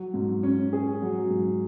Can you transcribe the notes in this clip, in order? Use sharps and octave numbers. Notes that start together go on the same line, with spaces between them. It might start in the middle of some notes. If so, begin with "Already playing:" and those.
Already playing: F#3
G#2
C#4
G#4
F#3
G#2